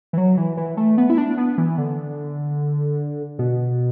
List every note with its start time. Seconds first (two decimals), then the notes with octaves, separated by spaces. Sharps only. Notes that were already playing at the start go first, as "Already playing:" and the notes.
0.13 E3
0.18 F#3
0.37 E3
0.57 E3
0.77 A3
0.98 B3
1.10 E4
1.18 D4
1.38 B3
1.58 E3
1.78 D3
3.39 B2